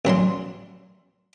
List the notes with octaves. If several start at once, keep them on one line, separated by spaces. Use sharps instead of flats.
A1 F#3 D4 C6